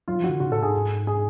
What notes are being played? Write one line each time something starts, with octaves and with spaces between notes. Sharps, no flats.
F#3 F4
F3 F#4
D3
C#3 F#4
A2 A4
G#2 G#4
G#4